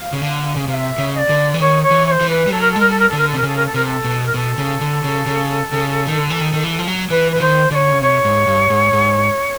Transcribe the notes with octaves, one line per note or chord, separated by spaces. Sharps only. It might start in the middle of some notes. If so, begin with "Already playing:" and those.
Already playing: F5
C#3
D3
C#3
C3 F5
E5
C#3
D#5
D5
D3
E3
D#3 C#5
C#5
E3
C#5
C5
E3
B4
G3
F#3 A4
A#4
A4
G#3
G3 A#4
A4
A#4
D3 A4
A#4
A4
C3 A#4
C#3 A4
A#4
A4
C3 A#4
A4
B2
A#4
B2 A4
C#3
D3
C#3
C#3
C#3
D#3
D3
E3
D#3
D#3
E3
F3
F#3
E3 B4
B4
E3
D#3 C5
D3 C#5 D5
C#3
C3 C#5
G#2
G2
G#2
G#2